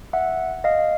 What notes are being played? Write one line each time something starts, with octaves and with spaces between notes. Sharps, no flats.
E5 F#5
D#5 F5